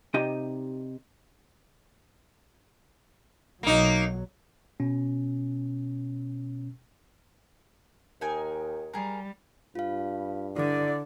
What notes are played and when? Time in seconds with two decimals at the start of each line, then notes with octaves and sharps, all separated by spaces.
0.14 C3 D#4 G4 D5 D#5 G5
3.63 B1 F#3 A#3 D#4
4.80 B2 C#4
8.21 D#2 D#4 G5 G#5
8.93 G3 G#4 A#4
9.75 G2 F4 F5
10.56 D3 E4 A4 D5 D6